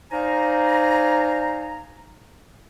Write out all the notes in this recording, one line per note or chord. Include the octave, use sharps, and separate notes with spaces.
D#4 C5 D5 F5 G#5 A#5